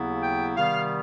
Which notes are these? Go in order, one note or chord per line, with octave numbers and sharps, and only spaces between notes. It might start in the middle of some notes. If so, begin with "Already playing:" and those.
Already playing: D#2 C#3 F#3 B3 E4
G5
C3 D#3 G3 B3 F5